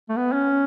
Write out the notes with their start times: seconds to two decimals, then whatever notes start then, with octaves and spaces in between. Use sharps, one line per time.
0.09 A3
0.17 B3
0.33 C#4